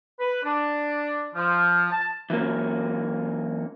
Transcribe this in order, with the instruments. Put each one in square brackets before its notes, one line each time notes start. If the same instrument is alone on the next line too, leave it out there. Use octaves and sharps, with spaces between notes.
[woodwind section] B4
D4
F3
A5
[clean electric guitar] E3 F#3 A#3 C#4